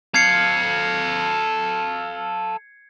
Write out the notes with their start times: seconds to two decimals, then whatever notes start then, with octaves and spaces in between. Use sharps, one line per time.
0.14 A4 F5 G#6 C7 C#7